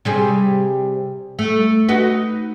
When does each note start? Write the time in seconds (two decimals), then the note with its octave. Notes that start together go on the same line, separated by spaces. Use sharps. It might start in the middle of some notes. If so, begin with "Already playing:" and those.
0.05 C3 G3 G#4
1.39 A3
1.88 D#4 F#4 B4